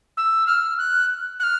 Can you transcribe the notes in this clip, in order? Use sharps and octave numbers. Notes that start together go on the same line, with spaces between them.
E6
F6
F#6
F#6
F6